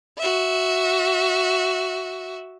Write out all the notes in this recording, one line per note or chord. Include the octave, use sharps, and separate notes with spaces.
F#4 E5